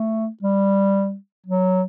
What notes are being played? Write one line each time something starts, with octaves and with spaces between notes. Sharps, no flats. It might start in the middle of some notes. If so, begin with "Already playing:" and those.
Already playing: A3
G3
F#3